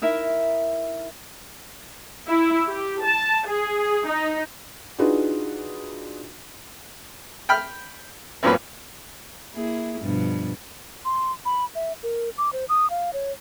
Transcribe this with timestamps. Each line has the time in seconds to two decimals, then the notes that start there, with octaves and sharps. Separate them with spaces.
0.02 D#4 E4 A#4 E5
2.27 E4
2.67 G4
3.02 A5
3.47 G#4
4.07 D#4
4.99 D4 D#4 F4 F#4 G#4 B4
7.49 G5 B5 F6
8.43 G#1 G2 F3 F#3 A#3 B4
9.53 A#3 E4 G#4
10.01 G2 B2 F3
11.05 C6
11.45 B5
11.75 E5
12.03 A#4
12.38 D6
12.53 C5
12.69 D#6
12.90 F5
13.13 C#5